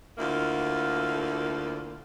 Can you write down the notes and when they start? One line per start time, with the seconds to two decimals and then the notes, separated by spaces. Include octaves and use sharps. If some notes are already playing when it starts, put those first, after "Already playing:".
0.18 D2 D3 A#3 E4 F4